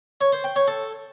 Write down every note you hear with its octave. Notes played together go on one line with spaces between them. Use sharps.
C#5
C5
G5
C#5
A4